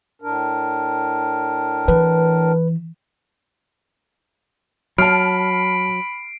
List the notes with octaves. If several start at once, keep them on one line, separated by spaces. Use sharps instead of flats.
A2 D4 A#4
E3 B4
F#3 A5 B5 F6 C7 D7